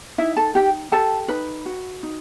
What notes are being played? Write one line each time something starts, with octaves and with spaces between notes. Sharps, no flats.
D#4 E4 E5
A4 A5
D#4 G4 G5
G4 A4 A5
D#4 B4 B5
F#4
D#4